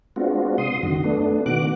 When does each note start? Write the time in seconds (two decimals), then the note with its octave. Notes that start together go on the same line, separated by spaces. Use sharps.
0.16 G#3 B3 C4 D4 F4 F#4
0.58 C3 C6 D#6
0.83 F#2 D3 D#3 F#4
1.04 A3 B3 D4
1.46 B2 D#3 B3 F#4 D6 F#6